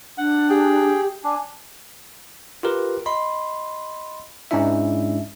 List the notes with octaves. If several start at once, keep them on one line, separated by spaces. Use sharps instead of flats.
D4 F#5
G4 G#4 G5
D4 G#5
F4 G4 A#4 B4
D#5 B5 C6
G#2 G#3 C#4 D4 E4 E5